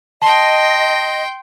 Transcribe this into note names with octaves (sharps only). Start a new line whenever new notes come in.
D#5 G5 A5 C6